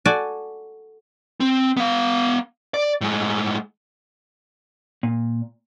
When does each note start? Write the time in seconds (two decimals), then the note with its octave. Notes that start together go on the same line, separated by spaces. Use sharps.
0.05 F#4 A4 D5 G#5
1.40 C4
1.77 B3 F5
2.74 D5
3.01 A2 G#3
5.03 A#2